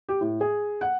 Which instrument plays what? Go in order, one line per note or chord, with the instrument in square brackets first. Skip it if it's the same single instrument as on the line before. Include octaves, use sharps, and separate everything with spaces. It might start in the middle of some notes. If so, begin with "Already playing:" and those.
[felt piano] G4
A2
G#4
F#5